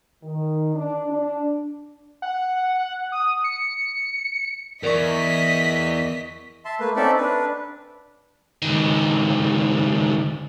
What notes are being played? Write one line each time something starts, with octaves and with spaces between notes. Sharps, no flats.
D#3
D4
D4
F#5
D#6
C#7
E2 A#4 D5 D#5 C#6 B6
E5 A5 C6
A3 A#3 B4
C4 C#4 D#4 A4 D5 E5
D4 B4
C#2 D#3